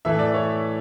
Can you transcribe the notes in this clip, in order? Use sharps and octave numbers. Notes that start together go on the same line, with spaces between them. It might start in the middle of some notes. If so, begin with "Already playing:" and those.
A2 E3 A3 E5
D5
C#5